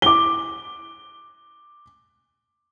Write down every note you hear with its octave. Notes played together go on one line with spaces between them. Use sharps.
D6 G7